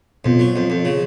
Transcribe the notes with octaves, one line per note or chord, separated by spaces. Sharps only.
F2 B2
F#3
F2
F2
C#3